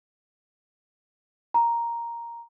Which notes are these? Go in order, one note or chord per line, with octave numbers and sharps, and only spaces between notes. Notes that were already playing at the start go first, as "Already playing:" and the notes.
A#5